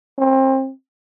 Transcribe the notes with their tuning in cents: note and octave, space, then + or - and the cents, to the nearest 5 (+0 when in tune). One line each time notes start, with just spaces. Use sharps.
C4 +30